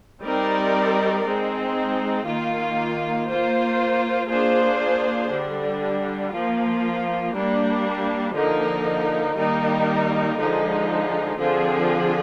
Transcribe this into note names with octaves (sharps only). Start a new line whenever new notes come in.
G3 C4 D#4 A#4 D5
G#3 C4 D#4
D#3 A#3 F4
A#3 F4 C5
A#3 D4 F4 G#4 C5
D3 G3 D4
F3 A#3 F4
G3 A#3 D4
D3 F3 A#3 D#4 A#4
D#3 G3 A#3 D#4 A#4
D3 F3 G#3 D#4
D3 F3 C4 F4 G#4